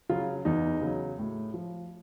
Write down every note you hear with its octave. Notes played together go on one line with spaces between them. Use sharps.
C#3 F#3 F4
E2 D#4
C#3 F#3
A2
F3